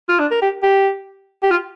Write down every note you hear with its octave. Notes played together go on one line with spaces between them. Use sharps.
F4
D4
A#4
G4
G4
G4
F4